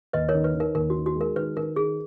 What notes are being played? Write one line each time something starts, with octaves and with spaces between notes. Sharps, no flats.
D#2 B4 D#5
A#4 C#5
D#3
B4
D#3
A#4
D#2 A#4
F#4
D#3
F#4
G#3
A#4
D#3 B4
D#3 A#4
D#3 G#4